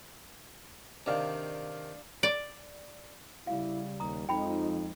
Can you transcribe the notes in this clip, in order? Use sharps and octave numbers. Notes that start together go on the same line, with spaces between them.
C3 D#3 D4 D5 F5
D5
C#3 G3 E4 F5
D#2 A#5 D#6
F2 F3 G#3 D#4 G5 B5